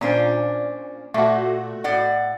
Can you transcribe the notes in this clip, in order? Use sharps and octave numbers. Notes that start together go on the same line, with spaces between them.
A#2 C#4 D4 C5
A#2 A3 F#4
A2 D5 F#5